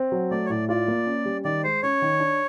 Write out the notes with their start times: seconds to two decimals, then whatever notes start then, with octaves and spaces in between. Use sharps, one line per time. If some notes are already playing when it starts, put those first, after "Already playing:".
Already playing: C4
0.12 F#3
0.31 A3 D5
0.45 C#5
0.50 A2 D5
0.69 F4 D5
0.88 A#3
1.06 C#4
1.25 G3
1.45 D#3 D5
1.64 G#3 C5
1.83 C#4 C#5
2.02 D#3
2.20 D4